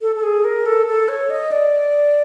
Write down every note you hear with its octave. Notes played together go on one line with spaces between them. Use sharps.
A4
A4
G#4
A#4
A4
A4
C#5
D#5
D5